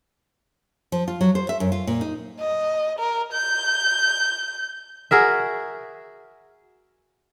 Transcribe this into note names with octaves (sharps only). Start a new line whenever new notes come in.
F3
F4
F#3
C5
E5
F#2
F4
A#2
D#4
D#5
A#4
G6
F#4 G#4 A#4 E5